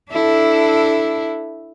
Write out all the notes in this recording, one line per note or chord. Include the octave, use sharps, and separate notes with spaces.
D4 E4 A4